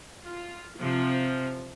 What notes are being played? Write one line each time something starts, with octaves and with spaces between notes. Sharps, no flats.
F4
C3 F3